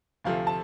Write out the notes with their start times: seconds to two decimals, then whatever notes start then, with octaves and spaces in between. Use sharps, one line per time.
0.24 D2 C3 F3 A3 F5
0.47 A5